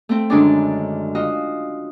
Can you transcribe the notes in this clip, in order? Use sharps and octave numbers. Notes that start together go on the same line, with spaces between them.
A3 C4
F#2 D3 D#3 G#3 C#4 D4
F4 F#4 D#5